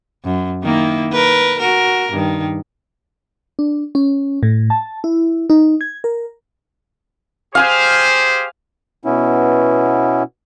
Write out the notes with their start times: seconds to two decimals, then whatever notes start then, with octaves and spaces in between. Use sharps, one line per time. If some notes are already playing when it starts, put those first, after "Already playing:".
0.25 F#2
0.63 D#3 A#3 E4
1.12 A#4 B4
1.59 F#4 A#4
2.12 G2 D#3
3.59 D4
3.95 C#4
4.43 A2
4.70 A5
5.04 E4
5.50 D#4
5.81 G#6
6.04 A#4
7.55 G4 G#4 C5 F5 G#5 E6
9.05 B2 B3 C#4 E4